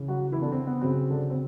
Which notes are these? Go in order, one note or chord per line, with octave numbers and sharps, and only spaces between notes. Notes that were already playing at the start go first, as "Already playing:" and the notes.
Already playing: C#3 E3
F#3 F#4
E3 E4
D3 D4
C4
B3
C#3 F#3 C4
D3 D4
C4